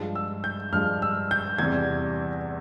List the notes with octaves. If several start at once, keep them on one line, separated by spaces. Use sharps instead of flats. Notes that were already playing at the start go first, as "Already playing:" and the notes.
Already playing: G2 F3 G#3
E6
G6
G2 F3 G#3 F6
E6
G6
E2 C3 E3 G3 G#6